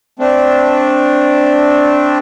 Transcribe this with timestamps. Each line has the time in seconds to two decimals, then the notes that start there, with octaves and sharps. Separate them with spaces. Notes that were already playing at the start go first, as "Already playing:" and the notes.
0.19 A3 C4 D4